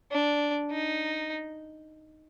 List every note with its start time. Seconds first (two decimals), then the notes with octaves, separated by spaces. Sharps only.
0.12 D4
0.71 D#4